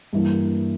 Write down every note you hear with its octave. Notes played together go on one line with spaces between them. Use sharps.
G2 E3 A#3